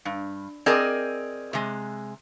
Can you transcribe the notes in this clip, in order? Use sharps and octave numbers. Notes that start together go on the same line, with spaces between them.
G2
C4 G#4 A#4 D5 D#5
C3 G#3